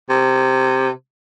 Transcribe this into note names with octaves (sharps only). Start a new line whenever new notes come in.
C3